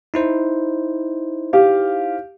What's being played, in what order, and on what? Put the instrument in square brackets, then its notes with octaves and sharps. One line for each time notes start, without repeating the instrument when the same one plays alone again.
[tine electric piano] D#4 E4 C5
[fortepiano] G4 F5